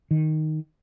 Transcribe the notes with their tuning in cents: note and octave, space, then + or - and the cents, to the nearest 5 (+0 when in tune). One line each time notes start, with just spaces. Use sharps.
D#3 +0